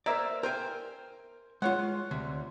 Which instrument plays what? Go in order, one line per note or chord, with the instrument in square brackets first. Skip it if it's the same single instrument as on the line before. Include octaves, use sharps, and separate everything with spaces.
[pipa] A#3 E5 [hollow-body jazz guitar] A#4 C5 D5
[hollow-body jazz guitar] A#4 G5 G#5 [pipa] C5
[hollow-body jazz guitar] G#3 F4 [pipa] C#5 F#5
[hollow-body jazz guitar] D2 C3